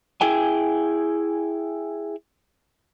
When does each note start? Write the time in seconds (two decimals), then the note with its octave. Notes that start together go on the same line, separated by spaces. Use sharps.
0.21 E4 G#4 G5 G#5